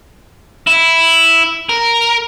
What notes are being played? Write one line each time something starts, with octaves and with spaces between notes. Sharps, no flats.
E4
A#4